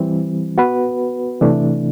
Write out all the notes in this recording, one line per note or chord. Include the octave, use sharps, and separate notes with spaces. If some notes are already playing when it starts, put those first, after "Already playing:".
Already playing: E3 G3 C4
B3 F#4 B4
C3 E3 A3 D4